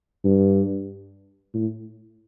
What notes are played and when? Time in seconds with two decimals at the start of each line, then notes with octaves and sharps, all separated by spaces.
0.24 G2
1.54 A2